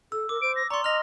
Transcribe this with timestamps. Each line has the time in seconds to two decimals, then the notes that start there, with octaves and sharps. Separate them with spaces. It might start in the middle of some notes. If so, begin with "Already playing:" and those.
0.12 A4 E6
0.29 A#4 D6
0.42 C5 D7
0.56 A#6
0.70 D5 A#5 C6 C#6
0.84 D#5 F6 A#6 F7